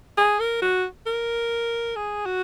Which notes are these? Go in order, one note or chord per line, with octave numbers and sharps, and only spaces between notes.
G#4
A#4
F#4
A#4
G#4
F#4